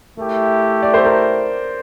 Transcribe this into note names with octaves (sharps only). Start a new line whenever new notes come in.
A3 E4 G4 A#4
D5
C5
A#4